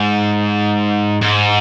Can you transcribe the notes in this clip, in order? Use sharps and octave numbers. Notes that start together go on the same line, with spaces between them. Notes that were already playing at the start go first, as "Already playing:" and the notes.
Already playing: G#2
G#2